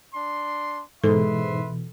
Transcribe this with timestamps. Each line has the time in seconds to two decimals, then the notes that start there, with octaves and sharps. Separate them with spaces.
0.14 D4 C6
1.04 G#2 B2 E3 A4 B4 E5 C6